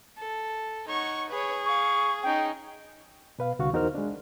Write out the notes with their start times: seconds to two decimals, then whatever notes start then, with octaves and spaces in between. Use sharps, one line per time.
0.18 A4
0.88 D#4 C#5 F#5 C#6
1.30 G#4 B4 C#5
1.66 F5 C#6
2.23 C#4 D#4 G5
3.39 B2 B4 F5
3.59 C2 D3 F#4 F5 C#6
3.73 E2 D#4 F#4 A#4 C5 F6
3.95 G#3 D4